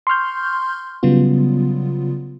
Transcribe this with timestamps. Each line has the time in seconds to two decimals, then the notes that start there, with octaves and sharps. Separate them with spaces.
0.07 C6 C#6 F6 G6
1.03 C#3 F#3 G3 B3 F4